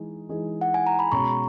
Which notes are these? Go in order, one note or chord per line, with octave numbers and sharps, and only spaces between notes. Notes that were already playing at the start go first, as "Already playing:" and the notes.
Already playing: E3 G#3 D#4
E3 G#3 D#4 G#4
F#5
G#5
A#5
B5
B2 G#3 C#4 F#4 A#5 C#6